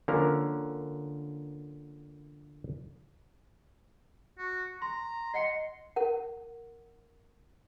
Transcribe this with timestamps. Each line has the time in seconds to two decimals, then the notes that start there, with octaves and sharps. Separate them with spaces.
0.08 D3 F3 A#3 C#4 A#4
4.38 F#4
4.82 A#5 C6
5.34 D#5 F#5 C6 C#7
5.96 A#4 F#5